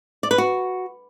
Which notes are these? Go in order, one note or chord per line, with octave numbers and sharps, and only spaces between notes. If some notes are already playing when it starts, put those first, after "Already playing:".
D5
B4
F#4